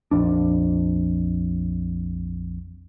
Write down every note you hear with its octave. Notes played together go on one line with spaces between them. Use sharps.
A#1 F2 D4